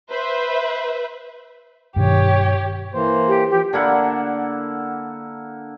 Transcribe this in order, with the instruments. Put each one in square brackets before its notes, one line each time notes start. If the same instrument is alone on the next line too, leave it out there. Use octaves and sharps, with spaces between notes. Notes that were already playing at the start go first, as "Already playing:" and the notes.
[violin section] B4 C5 E5
[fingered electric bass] G2 B2 D#3 [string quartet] G4 C#5
[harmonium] E3 A#3 C5
[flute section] G4
[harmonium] F3 [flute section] G4
[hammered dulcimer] D3 A#3 E4 F#5